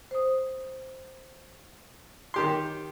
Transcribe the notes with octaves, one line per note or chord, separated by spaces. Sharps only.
C5 D#6
D#3 G4 C6